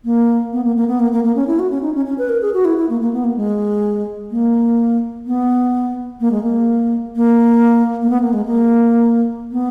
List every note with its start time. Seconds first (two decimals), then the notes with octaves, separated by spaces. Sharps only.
0.05 A#3
0.53 B3
0.64 A#3
0.76 A#3
0.88 B3
0.99 A#3
1.12 A#3
1.24 A#3
1.36 C#4
1.47 E4
1.59 F#4
1.70 C#4
1.82 D#4
1.95 C#4
2.06 C#4
2.18 B4
2.29 A#4
2.42 G#4
2.54 F#4
2.65 E4
2.77 E4
2.89 A#3
3.01 A#3
3.13 B3
3.24 A#3
3.36 G#3
4.31 A#3
5.26 B3
6.20 A#3
6.31 G#3
6.43 A#3
7.16 A#3
8.02 A#3
8.10 B3
8.22 A#3
8.33 G#3
8.46 A#3
9.52 B3